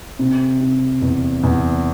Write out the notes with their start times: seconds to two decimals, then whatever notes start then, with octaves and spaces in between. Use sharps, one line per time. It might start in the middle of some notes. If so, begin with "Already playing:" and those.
0.19 C3
0.61 C3
1.02 E2
1.43 E2